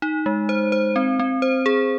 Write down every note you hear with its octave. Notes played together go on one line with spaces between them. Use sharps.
D#4
G#3
C5
C5
C4
C4
C5
G#4